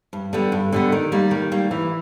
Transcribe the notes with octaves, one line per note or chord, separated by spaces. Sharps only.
G2
D3 G3 B3
G2
D3 G3 B3
D#3
G3 A#3
D#3
G3 A#3
E3